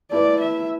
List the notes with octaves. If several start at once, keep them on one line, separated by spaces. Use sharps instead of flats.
A3 E4 B4 D5
E5